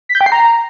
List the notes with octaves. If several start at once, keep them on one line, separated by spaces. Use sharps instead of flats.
B6
G6
G5
C7
A#5